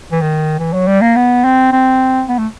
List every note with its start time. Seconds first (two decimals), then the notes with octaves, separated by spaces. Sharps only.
0.12 E3
0.22 D#3
0.59 E3
0.73 F#3
0.87 G3
1.01 A#3
1.16 B3
1.44 C4
1.72 C4
2.29 B3
2.39 A3